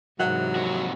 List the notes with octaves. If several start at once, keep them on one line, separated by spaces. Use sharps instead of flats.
G#2 C3 E3 F#3 F#5
F2 A#2 F#4